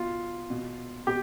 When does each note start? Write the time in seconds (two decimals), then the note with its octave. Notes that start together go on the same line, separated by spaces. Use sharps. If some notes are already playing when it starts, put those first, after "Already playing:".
Already playing: B2 F4
0.50 B2
1.07 B2 G4